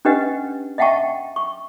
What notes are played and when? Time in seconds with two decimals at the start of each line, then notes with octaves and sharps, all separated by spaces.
0.05 C#4 D4 G4 B4 D#5 F#5
0.78 D#5 E5 F#5 G5 A5 C#6
1.36 C#6